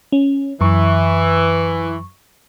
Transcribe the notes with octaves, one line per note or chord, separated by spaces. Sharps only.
C#4
F#2 E3 C#6